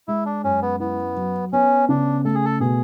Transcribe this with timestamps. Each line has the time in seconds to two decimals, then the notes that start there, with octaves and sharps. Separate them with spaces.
0.08 G#3 E4
0.26 D4
0.44 F#2 C#4
0.62 B3
0.80 B3 E4
1.16 F#3
1.53 B3 C#4
1.89 C#3 D4
2.25 A3 A4
2.35 G#4
2.45 A4
2.60 B2 G#4